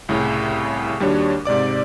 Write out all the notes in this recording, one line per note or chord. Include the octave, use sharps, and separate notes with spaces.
C2 A2 C#3
D#2 G3 D4 F#4 C#5
G#2 C3 D5 D6